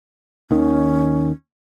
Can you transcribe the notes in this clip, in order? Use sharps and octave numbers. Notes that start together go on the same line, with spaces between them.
D#2 D#3 C#4